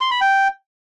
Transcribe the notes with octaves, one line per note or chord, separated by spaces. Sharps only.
C6
B5
G5